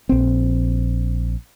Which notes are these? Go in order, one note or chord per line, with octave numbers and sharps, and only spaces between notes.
A#1 C4